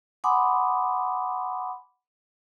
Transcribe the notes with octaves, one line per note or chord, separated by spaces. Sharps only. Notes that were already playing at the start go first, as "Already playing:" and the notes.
F#5 G#5 B5 C6 D6 D#6